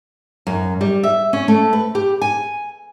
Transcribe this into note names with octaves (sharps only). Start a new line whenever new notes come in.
F#2
G3
E5
C#4
A3
B4
G4
G#5